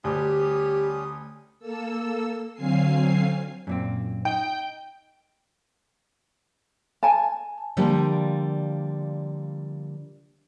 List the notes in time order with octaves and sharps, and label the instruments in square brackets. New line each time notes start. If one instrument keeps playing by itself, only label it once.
[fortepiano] D2 [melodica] G3 C#4 D#6 [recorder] G4
[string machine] A#3 A4 E6
D3 F#3 C4 F5 G#5 C7
[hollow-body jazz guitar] F#2 A#2 C4
[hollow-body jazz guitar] D#4 [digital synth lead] G5
[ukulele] G#5 A5
[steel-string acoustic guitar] D3 F3 G3 A#3